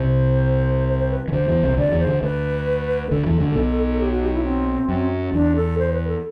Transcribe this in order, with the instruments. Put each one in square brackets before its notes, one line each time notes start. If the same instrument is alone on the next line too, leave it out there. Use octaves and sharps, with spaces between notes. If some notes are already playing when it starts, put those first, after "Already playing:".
Already playing: [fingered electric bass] C2 C3 [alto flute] C5
[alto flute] C5
C5
B4
[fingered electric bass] E3
[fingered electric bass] D2 D3 [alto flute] C5
[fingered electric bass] E2 E3
C2 C3
[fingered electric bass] D2 D3 [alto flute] D5
[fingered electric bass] E2 E3
[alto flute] C5
[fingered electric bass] D2 D3
[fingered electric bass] D2 D3 [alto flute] B4
[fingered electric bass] D2 D3 [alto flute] A4
[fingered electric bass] E2 E3
D2 D3
B1 B2
[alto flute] G4
F#4
G4
E4
C4
[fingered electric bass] F#2
[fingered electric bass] E2 [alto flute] D4
[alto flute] A4
C5
B4
A4